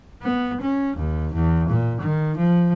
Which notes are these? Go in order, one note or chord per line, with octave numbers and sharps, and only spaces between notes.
B3
C#4
D#2
E2
A#2
D#3
F3